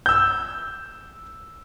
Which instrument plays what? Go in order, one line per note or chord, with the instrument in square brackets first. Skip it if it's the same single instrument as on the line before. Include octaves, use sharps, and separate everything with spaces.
[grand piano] E6 G6